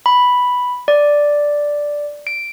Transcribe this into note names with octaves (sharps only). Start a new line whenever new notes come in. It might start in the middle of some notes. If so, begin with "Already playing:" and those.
B5
D5
D7